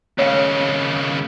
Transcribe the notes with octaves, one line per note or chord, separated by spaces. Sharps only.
D#2 C#3 C#5 F5